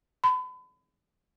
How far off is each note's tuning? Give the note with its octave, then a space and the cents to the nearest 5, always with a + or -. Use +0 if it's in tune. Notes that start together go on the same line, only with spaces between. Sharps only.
B5 +40